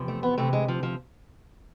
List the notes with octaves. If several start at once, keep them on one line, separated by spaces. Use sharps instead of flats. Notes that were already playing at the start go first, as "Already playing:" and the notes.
Already playing: E2 C3 F3
A3
B3
D2 C3 E3 A3
G#3
F3
F3